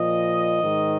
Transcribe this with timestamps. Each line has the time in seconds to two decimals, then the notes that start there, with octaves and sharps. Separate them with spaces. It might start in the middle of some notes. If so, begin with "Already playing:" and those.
Already playing: A#2 F3 D#5
0.63 G#2 D#3